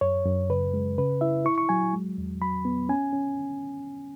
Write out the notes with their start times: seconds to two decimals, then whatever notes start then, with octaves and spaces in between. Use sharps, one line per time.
0.01 F#2 C#5
0.25 F#2
0.49 C#3 B4
0.74 G#3
0.98 C#3 B4
1.21 E4 E5
1.45 E4 C#6
1.58 C#6
1.69 F#3 G#5
1.93 G#3
2.18 E2
2.42 F#3 B5
2.65 B3
2.89 C#4 G#5
3.13 C#4